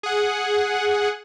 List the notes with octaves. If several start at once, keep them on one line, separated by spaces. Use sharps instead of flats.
G#4 F#5